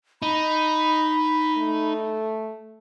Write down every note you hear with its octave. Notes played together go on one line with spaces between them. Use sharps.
D#4 B5
A3